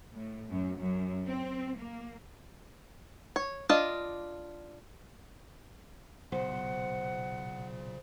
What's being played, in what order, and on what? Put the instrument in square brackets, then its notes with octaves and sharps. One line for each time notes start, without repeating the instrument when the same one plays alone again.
[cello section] A2
F#2
F#2
C4
A#3
[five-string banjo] C#5
D4 F4 D#5
[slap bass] B1 [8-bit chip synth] A#2 C#3 [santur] C5 [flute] F#5